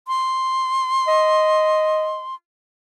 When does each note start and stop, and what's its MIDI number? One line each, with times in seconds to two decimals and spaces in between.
0.07 2.35 84
1.07 2.21 75